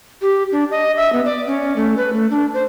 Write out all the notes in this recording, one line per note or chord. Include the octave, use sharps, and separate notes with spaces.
G4
D4
D#5
E5
B3
D5
C#4
A3
B4
A3
D4
C5